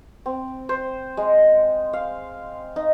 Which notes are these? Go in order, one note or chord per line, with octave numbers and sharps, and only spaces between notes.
C4
C5
G#3
F5
D#4